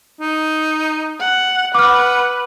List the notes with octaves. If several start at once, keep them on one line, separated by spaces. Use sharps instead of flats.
D#4
F#5
B4 F#5 D6 F6